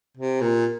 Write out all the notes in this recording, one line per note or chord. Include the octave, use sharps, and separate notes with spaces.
C3
A#2